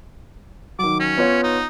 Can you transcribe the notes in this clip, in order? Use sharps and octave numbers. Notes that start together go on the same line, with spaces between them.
D#3 F#3 D6
C#4
B3 F4 C#5
D#4